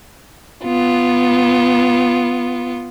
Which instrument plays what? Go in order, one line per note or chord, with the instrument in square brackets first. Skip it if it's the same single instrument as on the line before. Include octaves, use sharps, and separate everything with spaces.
[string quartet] B3 F4